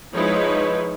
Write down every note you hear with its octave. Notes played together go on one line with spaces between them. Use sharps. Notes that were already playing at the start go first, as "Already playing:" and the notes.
F3 G#3 D#4 E4 B4 C#5